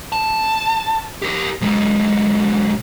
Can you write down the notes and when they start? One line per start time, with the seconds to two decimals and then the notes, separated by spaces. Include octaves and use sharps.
0.12 A5
1.22 G4 A#4
1.61 B1 G#3